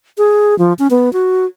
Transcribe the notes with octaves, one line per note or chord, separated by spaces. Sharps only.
G#4
F3
C#4
B3
F#4